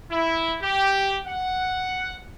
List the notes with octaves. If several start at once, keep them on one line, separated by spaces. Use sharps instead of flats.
E4
G4
F#5